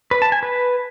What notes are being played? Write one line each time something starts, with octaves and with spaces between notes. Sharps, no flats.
B4
A5
G#5
B4